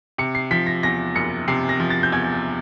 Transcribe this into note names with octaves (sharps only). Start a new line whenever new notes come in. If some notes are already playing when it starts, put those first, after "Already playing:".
C3 C#7
C7
F3 B6
A#6
E2 A#6
F#1 C#7
C3 C7
A#6
F3
A6
G6
E2 G#6